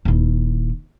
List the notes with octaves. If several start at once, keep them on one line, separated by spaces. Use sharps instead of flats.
D#1 E4